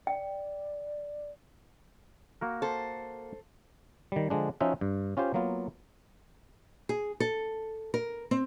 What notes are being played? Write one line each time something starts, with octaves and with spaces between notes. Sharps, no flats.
D5 G5
A#3 F#4 A#4
A4 C5
D#3 G3
D3 F3 G#3 D4
F3 C#4 D#4 F#4 C5 E5
G2
C#4 F4 G4 C5
F#3 A#3 B3 F4
G#4
A4
A#4
C4